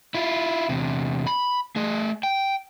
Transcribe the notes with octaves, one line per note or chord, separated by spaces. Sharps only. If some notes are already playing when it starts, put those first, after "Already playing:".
E4 F4
E2 C3
B5
A3 G#4
G5